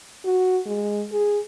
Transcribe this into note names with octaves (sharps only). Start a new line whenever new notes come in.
F#4
G#3
G#4